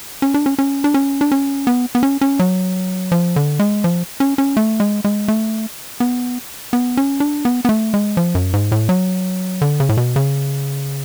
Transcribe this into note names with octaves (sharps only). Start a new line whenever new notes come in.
C#4
D4
C#4
C#4
D4
C#4
D4
C#4
B3
B3
C#4
C#4
F#3
F3
D3
G#3
F3
C#4
C#4
A3
G#3
G#3
A3
B3
B3
C#4
D4
B3
B3
A3
G#3
F3
F#2
G#2
A2
F#3
D3
C#3
A2
B2
C#3